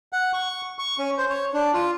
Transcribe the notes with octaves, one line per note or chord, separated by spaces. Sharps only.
F#5
C#6
C#6
C#4
C5
C#5
D4
F4